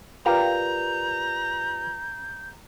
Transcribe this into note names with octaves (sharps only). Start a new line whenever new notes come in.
F4 G4 A#4 B4 D5 F5 A#5 G6